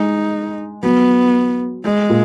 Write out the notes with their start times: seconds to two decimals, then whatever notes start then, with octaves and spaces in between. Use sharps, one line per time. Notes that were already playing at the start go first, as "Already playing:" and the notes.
Already playing: G#3 D#4
0.83 F#3 B3
1.84 G#3
2.10 A#2